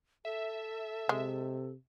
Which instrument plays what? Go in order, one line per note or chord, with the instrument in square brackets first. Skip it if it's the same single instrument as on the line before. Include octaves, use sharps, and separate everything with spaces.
[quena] A4 [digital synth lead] E5
[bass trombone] C3 [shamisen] G#3